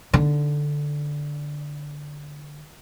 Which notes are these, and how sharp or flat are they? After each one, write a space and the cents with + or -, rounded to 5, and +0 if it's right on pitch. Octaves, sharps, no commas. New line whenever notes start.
D3 +0 D#4 +0